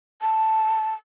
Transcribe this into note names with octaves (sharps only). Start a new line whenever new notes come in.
A5